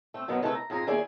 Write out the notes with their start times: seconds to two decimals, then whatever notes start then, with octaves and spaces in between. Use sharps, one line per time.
0.14 A3 C4
0.28 F#2 B2 F#3 B3
0.42 C3 G#3 A3 E4 A4 B4
0.55 A#5
0.70 F2 G#2 G#4 G#5 A#5
0.87 D#2 E4 G#4 D5 G#5